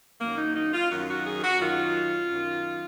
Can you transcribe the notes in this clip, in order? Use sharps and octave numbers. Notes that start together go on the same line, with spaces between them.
F#2 D#3 F#3 A#3
D#4
D#4
F4
F#2 D#3 F#3 F#4
F#4
G#4
F#4
F#2 D#3 F#3 F4
F#2 D#3 F#3